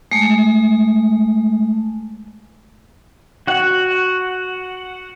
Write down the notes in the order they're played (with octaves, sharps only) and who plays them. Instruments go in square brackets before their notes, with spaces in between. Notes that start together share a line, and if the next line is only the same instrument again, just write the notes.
[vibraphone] G#3 A3
[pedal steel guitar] F#4 F#5